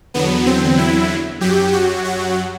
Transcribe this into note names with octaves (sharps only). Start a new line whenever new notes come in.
E2 D3 F#3 B3
C4
E4
F#2 F#3 G4
F#4
F#4